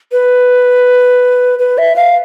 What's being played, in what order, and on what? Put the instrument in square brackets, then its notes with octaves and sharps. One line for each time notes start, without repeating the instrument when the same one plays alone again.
[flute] B4
B4
E5
F5